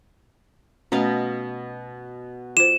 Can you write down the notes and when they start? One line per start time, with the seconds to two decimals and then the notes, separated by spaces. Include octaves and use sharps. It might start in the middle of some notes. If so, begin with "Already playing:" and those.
0.92 B2 A3 C#4 D#5 F5
2.57 F4 C5 E7